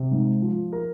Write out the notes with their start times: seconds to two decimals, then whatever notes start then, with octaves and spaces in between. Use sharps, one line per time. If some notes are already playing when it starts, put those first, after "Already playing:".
Already playing: C3
0.11 G#2
0.42 F3
0.73 A#4